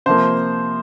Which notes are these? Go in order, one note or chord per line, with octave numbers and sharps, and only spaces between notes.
C3 F3 A#3 C5